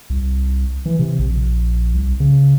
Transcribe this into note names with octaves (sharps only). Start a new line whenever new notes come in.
C2
E3
C3
A#1
C2
C#3